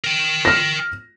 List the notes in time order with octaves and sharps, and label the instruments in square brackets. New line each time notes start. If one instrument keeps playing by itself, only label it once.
[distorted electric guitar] A#4 G5
[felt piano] F6 A#6